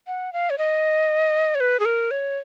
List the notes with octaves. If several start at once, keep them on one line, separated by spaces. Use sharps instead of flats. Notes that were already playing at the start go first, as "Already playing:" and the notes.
F#5
F5
C#5
D#5
C#5
B4
G#4
A#4
C#5